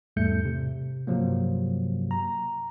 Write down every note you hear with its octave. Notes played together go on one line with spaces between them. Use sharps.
E2 G#2 G3 A3 G6 C#7
C3
G2 C3 F3 F#3 A#3
A#5